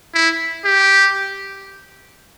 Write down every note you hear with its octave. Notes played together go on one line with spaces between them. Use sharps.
E4
G4